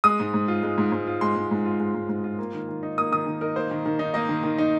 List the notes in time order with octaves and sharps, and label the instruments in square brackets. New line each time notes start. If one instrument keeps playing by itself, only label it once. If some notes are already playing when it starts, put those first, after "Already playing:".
[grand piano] G#3 [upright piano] D#6
[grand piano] G#2
G#2
F4
G#3
G#2
G#2
F4
[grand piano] G#3 [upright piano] C6
[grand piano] G#2
G#2
F4
G#3
G#2
G#2
F4
A#3
D#3
D#3
D#4
[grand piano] A#3 [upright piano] D#6
[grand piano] D#3 [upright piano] D#6
[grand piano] D#3
[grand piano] D#4 [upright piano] A#4
[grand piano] A#3 [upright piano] C5
[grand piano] D#3
D#3
D#4
[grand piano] A#3 [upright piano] D#5
[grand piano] D#3
D#3
D#4